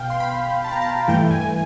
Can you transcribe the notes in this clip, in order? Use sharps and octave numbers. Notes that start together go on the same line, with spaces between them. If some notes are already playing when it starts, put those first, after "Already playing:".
Already playing: B2 F5 G5
C6
B5
A5
A#5
A5
G2 E3 A3 G5
G#5
G#5